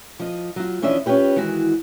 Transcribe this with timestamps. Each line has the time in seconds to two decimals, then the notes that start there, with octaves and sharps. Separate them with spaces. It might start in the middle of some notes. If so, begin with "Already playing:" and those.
0.19 F3 D#5
0.56 F#3 F4
0.82 E3 F3 C#4 D4 D#5 E5
1.06 C#4 D4 F4 G4 B4
1.36 D#3 E3 G#3 F#4